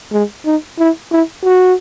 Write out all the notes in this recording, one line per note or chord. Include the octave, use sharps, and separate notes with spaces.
G#3
D#4
E4
E4
F#4